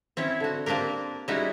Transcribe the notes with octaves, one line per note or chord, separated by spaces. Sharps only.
C4 C#4 E4 C#5
D3 F#4
A#3 C4 D4 G4 A#4
G3 G#3 C#4 D#4 E4 F#4